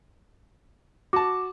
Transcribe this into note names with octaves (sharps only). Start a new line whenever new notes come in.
F#4 A5 D6